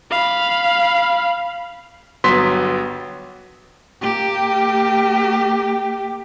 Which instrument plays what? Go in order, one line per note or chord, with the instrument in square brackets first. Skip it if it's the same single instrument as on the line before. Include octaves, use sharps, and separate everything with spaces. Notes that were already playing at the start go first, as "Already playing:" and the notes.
[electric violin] F5 B5
[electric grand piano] G1 F#3 B3 C6 B6
[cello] A#3 G4